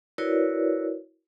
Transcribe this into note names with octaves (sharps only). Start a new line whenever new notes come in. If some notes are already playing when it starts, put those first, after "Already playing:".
E4 F#4 A#4 B4 C#5 D5